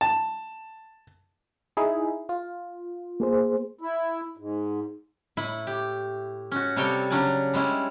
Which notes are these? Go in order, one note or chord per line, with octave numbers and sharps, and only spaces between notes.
A5
D#4 E4 G#4
F4
A#3 G#4 C5
E4
G#2
A2 E4 B5
G4
C#4 F#4
C3 G3 A4 C#5 G5
C#3 F#3 C#4 D4 D5 G#5
G3 G#3 C#4 E4